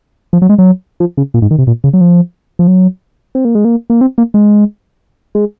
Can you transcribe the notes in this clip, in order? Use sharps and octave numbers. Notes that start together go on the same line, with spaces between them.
F3
F#3
G#3
F#3
F3
C#3
A#2
G#2
D#3
C3
A#2
C#3
F#3
F3
F3
F#3
C4
A#3
G#3
A#3
A#3
C4
A#3
G#3
G#3